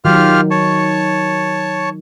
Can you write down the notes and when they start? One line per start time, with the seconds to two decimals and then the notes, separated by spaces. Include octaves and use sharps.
0.05 D#3 F#3 F4 G4 F6
0.51 C#5 A5 C#6